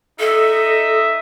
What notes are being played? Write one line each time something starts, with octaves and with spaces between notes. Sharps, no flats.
D#4 A4 D#5 E5